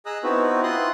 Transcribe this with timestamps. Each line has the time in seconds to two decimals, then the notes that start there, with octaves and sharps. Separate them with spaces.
0.06 G#4 D#5 A#5 D#6 E6 F#6
0.24 B3 C4 D#4 E4 F#4 B4
0.63 E4 F4 C6 D#6 F#6